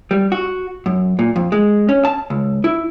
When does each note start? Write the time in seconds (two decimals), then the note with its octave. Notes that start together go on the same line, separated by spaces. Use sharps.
0.11 G3
0.32 F#4
0.86 F#2
1.19 A#2
1.36 F2
1.52 G#3
1.89 C#4
2.05 A5
2.30 C#2
2.64 E4